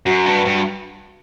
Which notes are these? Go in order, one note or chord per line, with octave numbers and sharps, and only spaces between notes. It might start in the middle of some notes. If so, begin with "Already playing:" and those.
F#2 F#4
G2
G2